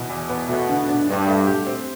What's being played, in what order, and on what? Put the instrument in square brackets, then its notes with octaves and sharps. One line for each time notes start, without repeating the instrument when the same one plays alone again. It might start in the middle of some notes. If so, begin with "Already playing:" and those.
Already playing: [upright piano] B2 E3
E2
B3
[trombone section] B2 [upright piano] A3
[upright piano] D3
D4
[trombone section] G2 [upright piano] D4
[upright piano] A3
G4
C4